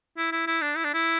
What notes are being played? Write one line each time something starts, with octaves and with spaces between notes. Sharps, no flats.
E4
E4
E4
D4
E4
D4
E4